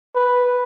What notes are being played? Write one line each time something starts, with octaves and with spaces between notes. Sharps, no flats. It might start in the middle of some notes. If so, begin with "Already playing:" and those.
B4